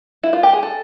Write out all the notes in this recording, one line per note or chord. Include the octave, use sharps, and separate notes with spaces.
E4
F4
G4
G#4
A4